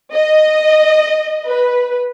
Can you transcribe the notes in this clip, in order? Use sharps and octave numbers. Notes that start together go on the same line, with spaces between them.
D#5
B4